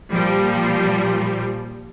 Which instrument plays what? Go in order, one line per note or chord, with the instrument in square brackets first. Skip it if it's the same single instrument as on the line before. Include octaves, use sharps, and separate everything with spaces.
[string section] A#2 F3 G3